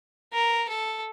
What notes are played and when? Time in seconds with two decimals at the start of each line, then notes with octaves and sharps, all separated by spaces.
0.33 A#4
0.69 A4